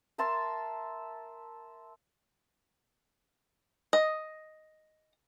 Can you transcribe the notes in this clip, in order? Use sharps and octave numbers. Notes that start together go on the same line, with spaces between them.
A#4 E5 A5 C6
D#5